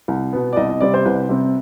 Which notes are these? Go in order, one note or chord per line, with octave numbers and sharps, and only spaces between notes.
C2
B2 B3
D5
C2 D#5
D#5
C3 G3 C4 D5
C5
C2 B4
C3 G3 C4